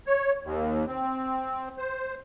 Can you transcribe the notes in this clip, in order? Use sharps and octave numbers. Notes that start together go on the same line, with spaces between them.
C#5
D#2
C4
C5